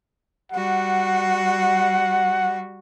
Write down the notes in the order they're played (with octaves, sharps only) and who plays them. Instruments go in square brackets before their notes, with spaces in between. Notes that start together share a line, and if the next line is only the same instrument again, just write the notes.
[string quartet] G3 F#4 [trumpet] F#5